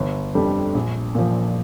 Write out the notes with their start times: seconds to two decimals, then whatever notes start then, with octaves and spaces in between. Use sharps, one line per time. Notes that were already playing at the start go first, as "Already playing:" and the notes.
Already playing: G1
0.35 F2 D3 G3
0.75 A#1
1.15 A#2 F3